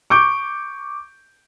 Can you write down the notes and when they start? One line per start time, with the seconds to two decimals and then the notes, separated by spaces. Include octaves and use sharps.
0.10 C#6 D6 G6 D7